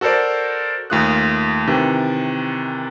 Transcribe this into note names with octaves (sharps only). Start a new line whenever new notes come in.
F#4 A4 A#4 C5 D5
D#2 A3 F4 D#6 F#6
C3 D#3 E3